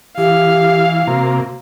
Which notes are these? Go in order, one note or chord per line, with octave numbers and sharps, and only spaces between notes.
E3 G4 F5
C3 A#3 F#4